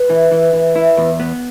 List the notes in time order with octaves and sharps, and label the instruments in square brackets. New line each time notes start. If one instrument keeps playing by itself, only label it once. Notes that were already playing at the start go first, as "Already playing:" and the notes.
Already playing: [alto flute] B4
[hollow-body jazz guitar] E3
E3
E3
E4
E2
B3